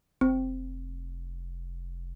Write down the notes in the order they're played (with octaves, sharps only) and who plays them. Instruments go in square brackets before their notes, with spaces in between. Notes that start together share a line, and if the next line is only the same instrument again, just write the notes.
[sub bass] F1 [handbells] C4